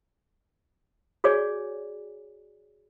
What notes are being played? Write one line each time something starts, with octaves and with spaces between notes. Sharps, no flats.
F#4 G#4 C#5 D5 G#5